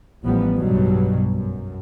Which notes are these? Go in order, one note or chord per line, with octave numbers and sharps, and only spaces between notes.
A1 F3 G3 B3
B1 G2 B2 F#3 G3
F#2